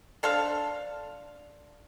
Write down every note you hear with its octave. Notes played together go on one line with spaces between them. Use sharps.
D4 A4 C5 F5